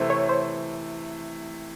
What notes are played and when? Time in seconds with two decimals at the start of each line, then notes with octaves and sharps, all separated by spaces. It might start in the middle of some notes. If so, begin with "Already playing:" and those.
Already playing: C3 E3 A3 C5
0.10 C#5
0.29 C5